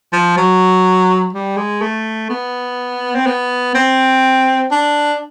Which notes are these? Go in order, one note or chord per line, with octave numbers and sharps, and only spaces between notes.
F3
F#3
G3
G#3
A3
B3
C4
B3
C4
D4